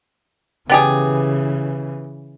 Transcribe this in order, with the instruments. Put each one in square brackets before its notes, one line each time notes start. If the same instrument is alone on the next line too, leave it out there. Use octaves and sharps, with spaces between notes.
[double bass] C#3 E3 [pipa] B3 G4 G#4